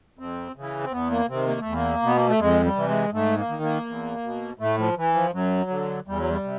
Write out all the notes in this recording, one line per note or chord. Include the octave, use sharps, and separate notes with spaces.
F2 C4
C#3 E3
C4
E2 B3
A#3
C3 D#3 C4
A#3
A3
E2
A#3
B2 B3
A#3
A3
F2 G#3
G3
C3 E3
G#3
G#2 A3
A#3
D#3
A#3
E2
B2
A2 A3
F3
E3
F3
F#2 F#3
D3
E2 G3
F#3
G3
C3